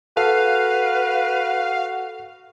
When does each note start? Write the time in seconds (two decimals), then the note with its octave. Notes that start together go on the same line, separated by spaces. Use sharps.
0.17 F#4 A4 B4 F5